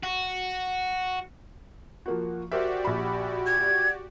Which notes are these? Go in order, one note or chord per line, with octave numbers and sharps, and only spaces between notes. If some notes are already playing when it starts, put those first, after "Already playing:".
F#4
F3 A#3 F#4
F#4 G4 A#4 C5 D5 E5
A#1 B5
G#6